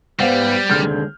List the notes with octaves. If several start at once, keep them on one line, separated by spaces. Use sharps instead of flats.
G#2 G3 B3 C5 F5 F#5
D#2 D3 G#3 F6 G6